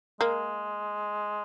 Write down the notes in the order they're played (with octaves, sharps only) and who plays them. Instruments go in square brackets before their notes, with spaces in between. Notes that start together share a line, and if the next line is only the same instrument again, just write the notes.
[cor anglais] G#3 [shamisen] A#3